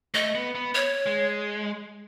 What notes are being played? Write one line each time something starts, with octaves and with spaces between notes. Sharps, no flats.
A3 D#5
B3
B3
C#5
G#3